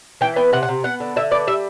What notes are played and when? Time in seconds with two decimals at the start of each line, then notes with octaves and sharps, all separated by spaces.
0.21 E3 G5
0.36 B3 G5
0.53 C3 F#5
0.63 F#5
0.69 C3
0.84 B3 F#5
1.00 D3
1.16 D3 E5
1.31 B3 D5
1.47 G3 E5